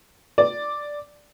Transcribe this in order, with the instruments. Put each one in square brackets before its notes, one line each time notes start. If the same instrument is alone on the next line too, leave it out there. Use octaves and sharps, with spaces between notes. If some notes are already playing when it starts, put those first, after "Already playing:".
[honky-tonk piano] D5